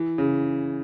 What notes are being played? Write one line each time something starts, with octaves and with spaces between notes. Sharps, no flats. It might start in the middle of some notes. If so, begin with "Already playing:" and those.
Already playing: E3
C#3